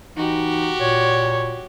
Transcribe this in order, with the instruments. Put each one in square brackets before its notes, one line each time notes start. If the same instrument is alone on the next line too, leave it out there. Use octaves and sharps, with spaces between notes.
[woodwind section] E3 D#4 [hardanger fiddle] F#4 G4
[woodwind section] A#2 [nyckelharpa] C#5